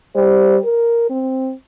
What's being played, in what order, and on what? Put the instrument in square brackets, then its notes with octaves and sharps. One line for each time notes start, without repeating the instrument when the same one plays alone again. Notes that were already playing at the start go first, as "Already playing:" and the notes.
[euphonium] G3 [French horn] C5
[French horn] A#4
C4